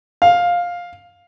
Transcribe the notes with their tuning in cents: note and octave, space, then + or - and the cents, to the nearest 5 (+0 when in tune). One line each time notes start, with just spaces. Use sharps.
F5 +10